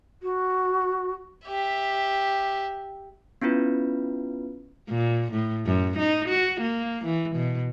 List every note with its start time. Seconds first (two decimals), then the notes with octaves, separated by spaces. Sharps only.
0.23 F#4
1.48 G4 E5
3.42 B3 C#4 E4 F4 B4
4.89 A#2
5.32 A2
5.66 F#2
5.98 D#4
6.29 F#4
6.61 A#3
7.05 E3
7.36 B2